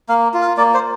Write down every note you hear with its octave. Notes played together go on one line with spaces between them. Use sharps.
A#3 F5
F4
F5
A#3 D5
C5